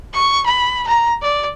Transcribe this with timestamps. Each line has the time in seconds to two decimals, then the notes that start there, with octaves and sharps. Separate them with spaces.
0.14 C#6
0.46 B5
0.88 A#5
1.22 D5